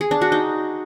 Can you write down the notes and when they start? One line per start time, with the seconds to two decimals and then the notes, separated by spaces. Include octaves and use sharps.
0.01 G#4
0.11 D4
0.21 F#4
0.32 D#4